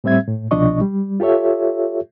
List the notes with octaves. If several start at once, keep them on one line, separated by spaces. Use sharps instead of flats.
A2 G3 C4 E5 G#6
A2
C2 B2 F3 D4 D#5 C#6
G3
F4 G4 A4 C#5 E5